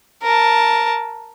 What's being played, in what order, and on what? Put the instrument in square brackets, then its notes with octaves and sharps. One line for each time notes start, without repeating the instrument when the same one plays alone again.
[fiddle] A#4 A5